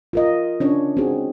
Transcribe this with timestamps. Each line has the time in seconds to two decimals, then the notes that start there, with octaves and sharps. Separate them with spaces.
0.13 F4 A#4 D#5
0.60 C#4 D4 C#5
0.97 C4 D#4 F#4 G#4